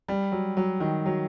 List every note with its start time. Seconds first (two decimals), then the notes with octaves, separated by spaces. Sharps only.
0.08 G3
0.32 F#3
0.57 F#3
0.80 D#3
1.06 F#3